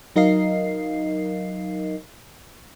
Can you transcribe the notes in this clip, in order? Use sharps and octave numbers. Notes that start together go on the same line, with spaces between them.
F#3 D#4 A#4 D#5 F5 C7